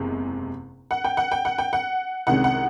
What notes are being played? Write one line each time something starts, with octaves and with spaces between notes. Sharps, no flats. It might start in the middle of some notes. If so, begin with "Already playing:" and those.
Already playing: F#1 E2 C3 G#3
F#5
G5
F#5
G5
F#5
G5
F#5
C2 C3 D#3 G#3 C#4 F#5
F#5